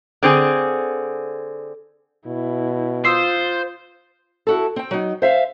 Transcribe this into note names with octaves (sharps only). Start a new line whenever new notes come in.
D3 C4 G#4
B2 E4
F4 C5 D#6 E6 C7
E4 F#4 A4
C4 G5
F#3 D#4
C5 E5 F5